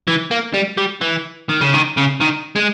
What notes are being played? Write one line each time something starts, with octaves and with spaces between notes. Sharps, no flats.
E3
A#3
G3
G3
E3
D#3
C#3
D#3
C#3
D#3
G#3